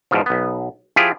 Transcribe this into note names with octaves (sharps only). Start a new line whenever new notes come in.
E2 G#2 B2 F3
B1 B3
F3 E4 F4 G4 G#4